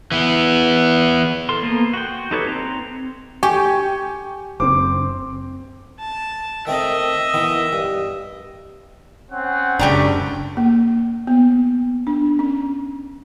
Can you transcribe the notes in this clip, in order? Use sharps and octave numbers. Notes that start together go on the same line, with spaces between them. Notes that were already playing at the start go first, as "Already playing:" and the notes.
E3 B3
A4 A#4 C6
A#3 B3 A4 A#4 C5
F#4 G5
D#4 G4 A4 B4 C#5
C4 A#5
G4 G5 G#5 C#6
F#1 C4 C5 D6
A5
D#3 A3 C4 D#5 E5
D#3 E3 B3
G2
C4 C#4 F#5
F#1 C#2 C#3 A3 D4 G4 A#4
A#3
B3
D4
C#4